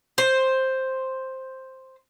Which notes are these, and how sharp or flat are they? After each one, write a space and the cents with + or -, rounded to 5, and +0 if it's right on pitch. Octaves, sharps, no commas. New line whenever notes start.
C5 +5